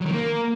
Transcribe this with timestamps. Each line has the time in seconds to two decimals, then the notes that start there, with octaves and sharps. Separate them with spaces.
0.01 F#3
0.06 D#3
0.11 A#3